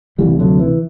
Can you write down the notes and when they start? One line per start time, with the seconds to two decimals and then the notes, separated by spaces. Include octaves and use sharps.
0.18 D2 C3 E3 G3
0.39 D3 F#3
0.59 E3